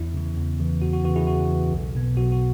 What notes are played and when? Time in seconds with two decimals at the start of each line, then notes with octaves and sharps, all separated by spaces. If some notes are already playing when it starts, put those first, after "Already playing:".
Already playing: E2 E4
0.14 C#3 E3
0.37 E2
0.59 C#3 E3
0.82 E2 F#4
0.93 F#4
1.05 E3 F#4
1.09 C#3
1.16 E4 G#4
1.27 E2 F#4
1.50 C#3 E3
1.72 B1
1.95 B2 B3
2.17 B1 F#4
2.32 F#4